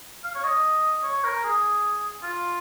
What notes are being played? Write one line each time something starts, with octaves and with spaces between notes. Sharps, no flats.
F5
C#5
D#5
C#5
A#4
G#4
F4